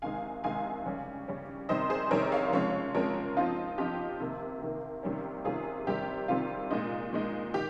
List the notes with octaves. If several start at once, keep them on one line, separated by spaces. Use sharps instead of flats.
C3 D#3 G#3 D#4 F5 G#5
C3 D#3 G#3 D#4 F5 G#5
C#3 G3 C#4
C#3 G3 C#4
C3 D#3 G3 C4 D#4 C5 D#5
G#4 C5
C3 D#3 G3 C4 D#4 A#4 C#5
C#5 F5
C#3 F3 G#3 C4 C#5 F5
C#3 F3 G#3 C4 A#4 C#5
F3 C4 D#4 F4
F3 C4 D#4 G4
C3 D#3 A#3
C3 D#3 A#3
C3 D#3 G3 A#3 C#4
C3 D#3 G3 A#3 C#4 F4 G#4
C3 D#3 G3 C4 G4
C3 D#3 G3 C4 F4
A#2 G#3 D#4
A#2 G#3 D#4
D#3 G4